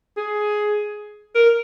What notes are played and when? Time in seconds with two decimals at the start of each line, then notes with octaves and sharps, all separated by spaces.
0.17 G#4
1.35 A#4